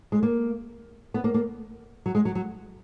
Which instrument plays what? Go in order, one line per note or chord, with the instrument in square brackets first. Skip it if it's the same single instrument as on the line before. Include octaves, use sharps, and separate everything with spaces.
[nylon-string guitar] G#3
A#3
B3
A#3
A#3
F#3
G#3
F#3
F#3